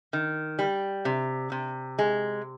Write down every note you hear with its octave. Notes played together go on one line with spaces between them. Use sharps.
D#3
G3
C3
C3
G#3